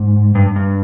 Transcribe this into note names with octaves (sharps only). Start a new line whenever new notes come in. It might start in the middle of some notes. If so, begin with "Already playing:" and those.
Already playing: G#2
G2
G2